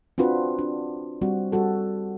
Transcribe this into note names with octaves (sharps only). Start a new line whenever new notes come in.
C4 D4 F4 F#4 B4
D4
G3 C4 F#4
G3 F#4 A4